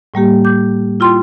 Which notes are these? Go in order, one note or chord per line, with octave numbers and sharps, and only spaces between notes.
A2 G3 A#3 G4
D6 G6
E4 F4 G5 C6